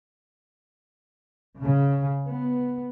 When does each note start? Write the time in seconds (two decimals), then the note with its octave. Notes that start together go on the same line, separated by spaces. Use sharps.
1.60 C#3
2.29 B3